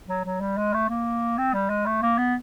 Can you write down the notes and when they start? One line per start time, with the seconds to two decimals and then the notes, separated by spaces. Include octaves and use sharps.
0.08 F#3
0.25 F#3
0.41 G3
0.57 G#3
0.74 A3
0.89 A#3
1.38 C4
1.53 G3
1.69 G#3
1.86 A3
2.02 A#3
2.18 B3